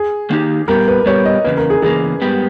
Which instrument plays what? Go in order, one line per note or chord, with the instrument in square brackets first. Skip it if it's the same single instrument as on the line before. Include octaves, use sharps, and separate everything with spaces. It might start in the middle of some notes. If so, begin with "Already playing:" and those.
Already playing: [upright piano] G#4
[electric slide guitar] D#3 A#3 D#4 G4
[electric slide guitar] A#2 G3 B3 G4 [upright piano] A#4
[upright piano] B4
B4
[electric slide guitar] A#2 G3 B3 G4 [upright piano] C#5
[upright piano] D#5
[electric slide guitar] E2 C#3 A#3 [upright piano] B4
[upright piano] A#4
G#4
[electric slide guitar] E2 C#3 E3 A#3 [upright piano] G#4
[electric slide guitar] G#2 G3 B3 G4